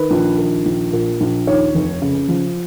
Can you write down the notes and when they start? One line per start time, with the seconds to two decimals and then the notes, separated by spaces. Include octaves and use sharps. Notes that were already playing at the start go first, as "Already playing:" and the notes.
Already playing: D#3 B4
0.11 A#1
0.38 D#3
0.66 A#1
0.93 A#2
1.21 A#1
1.47 D#2 C#5
1.75 F1
2.02 C#3
2.28 F3